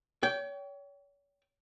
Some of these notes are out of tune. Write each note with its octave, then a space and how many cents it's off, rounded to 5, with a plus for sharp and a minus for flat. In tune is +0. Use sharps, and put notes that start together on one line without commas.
C#5 +35 G5 -10